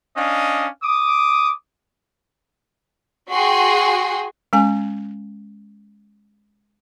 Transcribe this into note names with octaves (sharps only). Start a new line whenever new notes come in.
C#4 D4 D#5 F5
D6 D#6
F#4 G#4 G5 C6
G#3 C#4 G#5